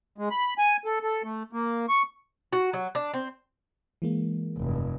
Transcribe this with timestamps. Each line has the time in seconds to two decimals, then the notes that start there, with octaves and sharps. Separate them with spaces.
0.18 G#3
0.31 B5
0.58 G#5
0.85 A4
1.03 A4
1.24 A3
1.53 A#3
1.89 C#6
2.53 F#4
2.73 F#3
2.95 D4
3.14 C4
4.02 E3 G#3 A#3
4.58 F1 G2